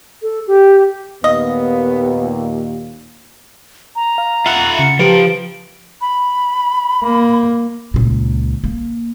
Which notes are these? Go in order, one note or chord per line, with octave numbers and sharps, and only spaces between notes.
A4
G4
D#2 A#2 B3 D#5 F5
A#5
F5
F4 E5 F#5 B5 F#6
C#3 A#5 C#7
F3 G4 B4 D7
B5
A#3
C#2 A#2
A#3